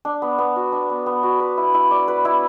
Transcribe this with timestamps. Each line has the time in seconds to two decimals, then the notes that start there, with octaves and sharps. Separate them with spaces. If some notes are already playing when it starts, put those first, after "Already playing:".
0.05 D4
0.22 B3
0.38 B3
0.56 F#4
0.72 D4
0.90 B3
1.06 B3
1.23 F#4
1.40 B4
1.58 E4
1.74 E4
1.91 D5
2.08 B4
2.25 E4